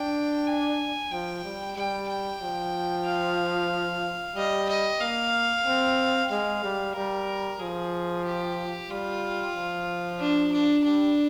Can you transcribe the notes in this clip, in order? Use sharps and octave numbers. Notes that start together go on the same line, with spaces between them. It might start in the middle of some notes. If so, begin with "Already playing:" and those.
Already playing: D4 G5
G#5
F3 G5
G3
G3 G5
G5
F3
F5
G3 D#5
D#5
A#3 F5
C4
G#3 F5
G3
G3 A#4
F3 G#4
G4
G3 F4
F3
D4
D4
G3 D4